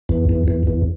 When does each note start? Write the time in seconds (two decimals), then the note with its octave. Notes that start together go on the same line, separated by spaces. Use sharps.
0.09 E2
0.29 E2
0.48 E2
0.67 E2